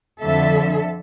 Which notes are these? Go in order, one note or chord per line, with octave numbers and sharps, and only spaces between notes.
F2 D3 A4 E5